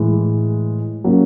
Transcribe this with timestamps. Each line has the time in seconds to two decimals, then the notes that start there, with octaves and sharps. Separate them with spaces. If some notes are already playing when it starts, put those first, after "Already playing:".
Already playing: A2 E3 G#3
1.04 C#3 F#3 A#3